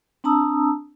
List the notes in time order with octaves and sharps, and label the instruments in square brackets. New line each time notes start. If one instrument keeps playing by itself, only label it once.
[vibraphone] C4 D4 A5 A#5 D#6 E6